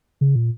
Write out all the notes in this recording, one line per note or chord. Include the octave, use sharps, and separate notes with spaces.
C#3
A#2